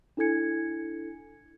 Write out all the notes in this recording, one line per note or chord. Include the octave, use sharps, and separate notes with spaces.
D4 E4 A4 G#5 G#6 C#7